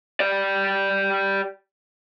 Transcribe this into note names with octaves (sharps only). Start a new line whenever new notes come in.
G4 D5